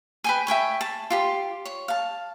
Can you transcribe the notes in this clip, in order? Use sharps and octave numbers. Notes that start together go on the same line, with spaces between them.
B4 G5 G#5
E5 G5 G#5 C#6
A5
F4 G4 C6
C#5
F5 A5